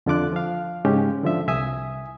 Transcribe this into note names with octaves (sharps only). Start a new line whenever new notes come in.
F2 D3 F4 D6 F#6
F3 F5
G#2 C#3 G#3 C#4 G4
D3 F3 E5
C2 E5 G#5 D#6